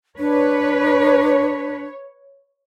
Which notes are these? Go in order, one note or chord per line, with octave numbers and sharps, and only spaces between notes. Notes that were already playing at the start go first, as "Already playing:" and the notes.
D4 B4 C#5